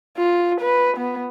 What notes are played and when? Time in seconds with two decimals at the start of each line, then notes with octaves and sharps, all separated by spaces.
0.17 F4
0.61 B4
0.97 B3